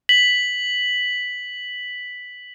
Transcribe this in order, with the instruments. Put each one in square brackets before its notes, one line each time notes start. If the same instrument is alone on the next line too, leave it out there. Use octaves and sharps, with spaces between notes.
[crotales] B6 F#7